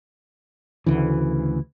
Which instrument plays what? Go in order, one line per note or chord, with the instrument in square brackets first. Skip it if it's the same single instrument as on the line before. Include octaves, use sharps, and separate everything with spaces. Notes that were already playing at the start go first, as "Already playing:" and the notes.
[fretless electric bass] D2 C#3 E3